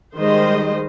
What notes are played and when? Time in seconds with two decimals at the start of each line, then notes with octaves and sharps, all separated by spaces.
0.16 D#3 G3 G#3 C5 D#5